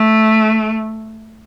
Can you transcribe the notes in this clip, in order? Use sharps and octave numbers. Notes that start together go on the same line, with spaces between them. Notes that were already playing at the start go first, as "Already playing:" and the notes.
Already playing: A3